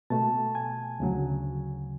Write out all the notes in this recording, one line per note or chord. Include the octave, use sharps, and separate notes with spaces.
B2 A3 A5
G#5
D2 C#3 F#3